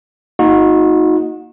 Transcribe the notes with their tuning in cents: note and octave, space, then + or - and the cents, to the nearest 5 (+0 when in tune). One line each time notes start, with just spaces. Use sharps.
A#3 +0 D#4 +10 F#4 -35